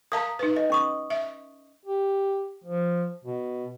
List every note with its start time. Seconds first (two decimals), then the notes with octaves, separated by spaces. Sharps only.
0.12 A#4 F5 A5 A#5 D#6
0.39 D#4 B4
0.56 D#5
0.70 C#4 C#6 D#6
1.10 E5
1.86 G4
2.64 F3
3.25 B2